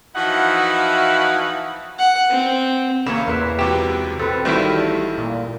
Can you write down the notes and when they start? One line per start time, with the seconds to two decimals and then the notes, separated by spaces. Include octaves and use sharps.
0.15 E3 F3 D#4 E4 F#4 F#5
1.99 F#5
2.30 C4
3.06 A1 C#3 A#3 E4 C#5 E7
3.28 E2 A#3 B4 E5 C6
3.59 C#2 C3 F#4 G4 B4 E7
4.19 A1 C4 A4 B4
4.45 A1 D#3 G3 A3 E4 F#4 C5 F5
5.18 A#2